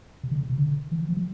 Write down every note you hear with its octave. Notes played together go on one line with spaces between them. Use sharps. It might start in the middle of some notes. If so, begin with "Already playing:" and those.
C3
D3
C#3
C3
D3
E3
F3
F#3